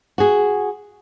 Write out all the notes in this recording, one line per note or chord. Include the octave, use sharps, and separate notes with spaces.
F#4 G#4